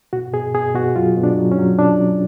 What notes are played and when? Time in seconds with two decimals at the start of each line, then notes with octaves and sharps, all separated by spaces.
0.13 B2 F#4
0.33 B2 G#4
0.54 B2 G#4
0.75 B2 F#4
0.96 F#3 F4
1.17 B2
1.23 D4
1.37 F#3
1.52 C#4
1.58 F#3
1.79 B2 D4
2.00 F#3